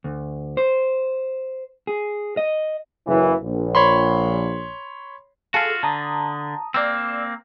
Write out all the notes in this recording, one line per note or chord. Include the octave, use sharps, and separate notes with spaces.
D2
C5
G#4
D#5
F#1 E3
A#1
C#5 B5 C6
F4 F#4 G#4 A4 F5
D3 A5 A#5 D#6
A#3 C4 D5 E6